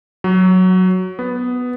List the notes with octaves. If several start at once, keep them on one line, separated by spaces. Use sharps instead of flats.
F#3
B3